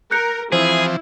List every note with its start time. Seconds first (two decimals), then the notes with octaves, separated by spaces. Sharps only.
0.11 A#4 F#6 G6 C#7
0.52 E3 F3 C4 E4 G#4 C5